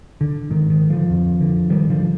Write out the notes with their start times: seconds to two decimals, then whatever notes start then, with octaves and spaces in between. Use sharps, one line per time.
0.21 D3
0.50 G#2 D#3
0.70 D#3
0.90 D3 F3
1.10 F2
1.41 D3
1.70 G#2 D#3 G3
1.90 D3 F3